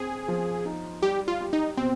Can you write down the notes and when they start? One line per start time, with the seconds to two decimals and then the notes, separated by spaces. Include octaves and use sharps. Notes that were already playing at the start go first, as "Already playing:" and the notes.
Already playing: C4 G#4
0.28 F3
0.65 D#4
1.02 G3 G4
1.28 F4
1.41 G4
1.53 D#4
1.77 B2 C4